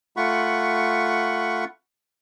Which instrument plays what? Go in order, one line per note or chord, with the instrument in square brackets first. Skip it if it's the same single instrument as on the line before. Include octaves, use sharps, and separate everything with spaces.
[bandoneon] A3 F4 F#5 B5 C#6